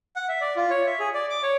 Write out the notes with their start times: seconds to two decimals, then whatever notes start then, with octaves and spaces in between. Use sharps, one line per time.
0.16 F#5
0.29 E5
0.41 D5
0.56 F4
0.70 C#5
0.86 E5
1.00 G#4
1.14 D5
1.30 D6
1.43 C#5